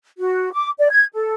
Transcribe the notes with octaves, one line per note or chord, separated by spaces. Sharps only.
F#4
D6
D5
G#6
A4